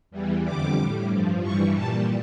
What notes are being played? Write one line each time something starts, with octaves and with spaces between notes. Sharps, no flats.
E2 E3 G3
F2 D3 G3 D6
A2 G3
G2 F3
G2 E3 G3 C#6
A#2 G3 A5